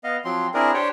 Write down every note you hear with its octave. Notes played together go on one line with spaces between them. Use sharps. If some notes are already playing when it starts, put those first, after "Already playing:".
B3 D#5 F5
F3 F#3 C4 C6
C4 D4 E4 G#4 A#4
D4 G4 C5 C#5 G5